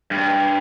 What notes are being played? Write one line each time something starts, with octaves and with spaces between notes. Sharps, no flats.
G2